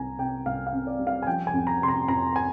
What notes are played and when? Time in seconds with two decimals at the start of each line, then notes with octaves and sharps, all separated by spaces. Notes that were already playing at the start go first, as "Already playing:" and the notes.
Already playing: C2 C4 G#5 A#5
0.18 C3 G5
0.46 C2 F5
0.66 F5
0.73 C4
0.87 D5
0.99 G3
1.07 F5
1.22 G#5
1.27 F3 G5
1.47 G#5
1.53 F2
1.67 A#5
1.82 C3 C6
1.88 A#5
2.08 F2 A#5
2.36 G#5